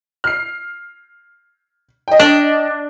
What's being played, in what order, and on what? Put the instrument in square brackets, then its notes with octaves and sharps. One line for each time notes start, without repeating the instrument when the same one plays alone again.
[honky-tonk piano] F6 C7
D#5 G5
[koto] D4